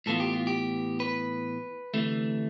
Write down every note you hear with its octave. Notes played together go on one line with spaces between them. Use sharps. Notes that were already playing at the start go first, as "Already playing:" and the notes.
A2 E3 B3 F4 A4
G4
F4
G4
B4
D2 C3 E3 A3